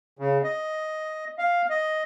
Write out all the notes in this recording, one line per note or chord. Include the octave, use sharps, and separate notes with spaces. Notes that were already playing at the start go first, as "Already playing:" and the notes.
C#3
D#5
F5
D#5